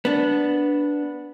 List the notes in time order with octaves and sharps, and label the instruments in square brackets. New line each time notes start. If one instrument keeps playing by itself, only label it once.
[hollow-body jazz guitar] B3 D4